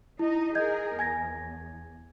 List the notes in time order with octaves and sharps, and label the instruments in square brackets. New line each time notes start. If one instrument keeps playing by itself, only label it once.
[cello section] D#4 D#5 [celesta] E4
[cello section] G#4 A#4 [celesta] D#5 G6 G#6
[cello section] E2 [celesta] G#5 G#6 A#6